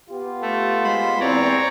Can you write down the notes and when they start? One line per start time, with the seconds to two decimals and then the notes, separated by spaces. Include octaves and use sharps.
0.10 B3 F4 G4
0.42 A3
0.84 G#3 C5 B5
1.20 E2 C4 C#5 D5 A#5